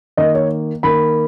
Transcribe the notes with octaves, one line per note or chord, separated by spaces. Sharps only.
D#3 A#3 D#5
C#5
D#3 A#3 B5